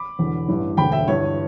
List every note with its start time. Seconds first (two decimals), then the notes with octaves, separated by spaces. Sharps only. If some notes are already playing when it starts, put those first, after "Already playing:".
Already playing: B5 D6
0.19 E1 E2 D3
0.48 A1 G2 E3
0.77 E1 D2 D3 G5 B5
0.92 E5 G5
1.07 G1 G2 E3 C#5